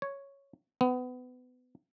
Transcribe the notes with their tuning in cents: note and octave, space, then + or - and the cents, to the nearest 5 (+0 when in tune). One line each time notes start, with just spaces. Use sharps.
C#5 +0
B3 +25